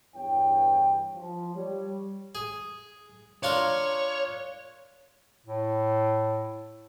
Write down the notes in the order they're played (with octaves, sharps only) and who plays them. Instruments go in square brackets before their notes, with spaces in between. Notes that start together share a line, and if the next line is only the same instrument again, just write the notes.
[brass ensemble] E2 G2 E3 C#5 G5
F3
G3 C#5
[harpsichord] G#4
[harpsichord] D4 F4 A#4 [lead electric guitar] C#5
[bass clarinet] A2